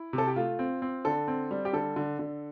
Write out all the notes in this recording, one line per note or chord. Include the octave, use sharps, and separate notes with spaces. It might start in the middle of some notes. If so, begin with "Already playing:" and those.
Already playing: E4
C3
A4
G4
A3 F4
C4
C4
D3 A4
C4
G3
G4
D3 A4
D3
D3